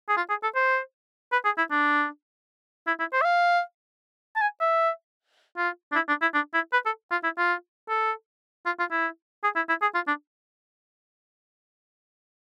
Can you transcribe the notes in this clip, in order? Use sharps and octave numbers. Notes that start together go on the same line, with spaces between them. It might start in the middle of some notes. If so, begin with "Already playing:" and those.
G#4
F4
G#4
A4
C5
B4
G#4
E4
D4
E4
E4
C5
E5
F5
A5
G#5
E5
F4
D4
E4
D4
E4
D4
E4
B4
A4
F4
E4
F4
A4
F4
F4
E4
G#4
E4
E4
G#4
F4
D4